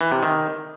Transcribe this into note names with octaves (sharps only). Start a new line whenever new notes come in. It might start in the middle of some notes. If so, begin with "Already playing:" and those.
E3
C3
D#3